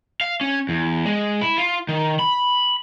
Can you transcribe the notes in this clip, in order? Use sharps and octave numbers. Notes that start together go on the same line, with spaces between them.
F5
C#4
E2
G#3
E4
F4
D#3
B5